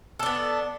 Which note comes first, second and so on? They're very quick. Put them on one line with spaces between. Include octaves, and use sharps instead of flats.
A4 D4 B3